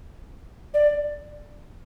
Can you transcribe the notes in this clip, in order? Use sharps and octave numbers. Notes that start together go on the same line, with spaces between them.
D5